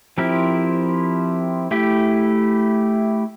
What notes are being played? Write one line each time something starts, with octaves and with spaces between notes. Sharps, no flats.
F3 C4 E4 G4 A#4
A3 E4 G4